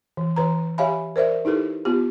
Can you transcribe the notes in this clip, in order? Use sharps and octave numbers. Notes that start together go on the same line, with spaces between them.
E3
E3 B4 A#5
G4 C#5 E5 F5 G#5 B5
A#4 C5 D5 E5
D#4 E4 G4 A4 B4
B3 F4 G4